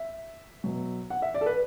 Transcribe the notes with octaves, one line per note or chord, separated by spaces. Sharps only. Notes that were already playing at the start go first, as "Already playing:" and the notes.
Already playing: E5
B2 F#3
F#5
E5
D5
A4
B4